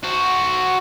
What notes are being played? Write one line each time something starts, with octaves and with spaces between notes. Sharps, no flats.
F#4 C5